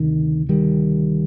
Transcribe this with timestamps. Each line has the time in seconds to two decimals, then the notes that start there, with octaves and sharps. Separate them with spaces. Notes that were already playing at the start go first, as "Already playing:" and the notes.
Already playing: D2 C3 D#3
0.49 D#3 G3